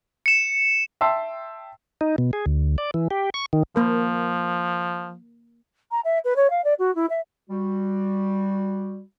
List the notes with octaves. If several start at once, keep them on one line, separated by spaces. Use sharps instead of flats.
C#7 E7
E5 G5 A5 C6 E6 C7
D#4
B2
G#4
D2
D5
E3
G4
C#6
D#3
F3 A#3 A#4
A#5
E5
B4
C#5
F5
D5
F#4
E4
E5
G3 F#4